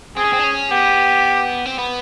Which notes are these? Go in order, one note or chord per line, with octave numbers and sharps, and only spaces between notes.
C4 G#4
C#4
C4
D4
C#4
B3 G4
C4
B3